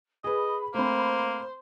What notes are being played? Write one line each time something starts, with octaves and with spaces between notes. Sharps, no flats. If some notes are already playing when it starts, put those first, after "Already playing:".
G#4 B4 D#5 B5
A3 A#3 C4 C5